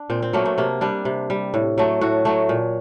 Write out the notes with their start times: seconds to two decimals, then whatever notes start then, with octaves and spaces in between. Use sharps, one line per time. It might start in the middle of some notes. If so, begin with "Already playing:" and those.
Already playing: D4
0.10 A#2 C4
0.22 C4
0.33 F#3 A3 A#3
0.45 A3
0.58 C3 A#3
0.81 G3 D4
1.05 C3
1.30 G3
1.54 A2
1.78 F#3 A3
2.01 A2 F#4
2.25 F#3 A3
2.49 A#2